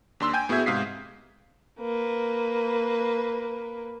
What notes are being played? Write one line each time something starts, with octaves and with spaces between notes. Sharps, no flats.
D#2 D4 C6 E6
G5 G#5 G6
A2 B3 F#4 G#4 E5 G#6
G#2 C3 F5 D#6 B6 C7
A#3 B4